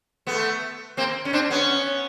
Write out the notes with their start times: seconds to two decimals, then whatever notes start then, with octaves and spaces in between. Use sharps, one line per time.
0.27 A3 B3
0.97 A#3 C4
1.25 C#4
1.33 C4 D4
1.50 B3 C#4